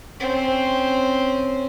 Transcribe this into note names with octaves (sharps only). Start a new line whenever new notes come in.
C4 C#4